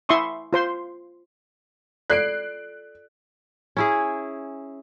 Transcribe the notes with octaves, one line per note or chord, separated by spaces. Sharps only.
E4 E5 C6 C#6 D#6
F4 C5 C6
F4 A4 D5 F#6 C7 D7
C#4 E4 G#4